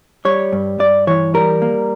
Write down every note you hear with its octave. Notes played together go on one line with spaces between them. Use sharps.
G3 C#5
G2
G2 D5
E3 C#5
G3 A#4
A#3